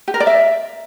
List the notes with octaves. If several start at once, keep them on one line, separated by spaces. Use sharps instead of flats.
G4
A#4
D5
E5